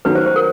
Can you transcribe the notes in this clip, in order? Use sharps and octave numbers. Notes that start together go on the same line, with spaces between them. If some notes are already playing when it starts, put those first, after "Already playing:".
D#3 F#3 A3 B4
C5
C5
A#4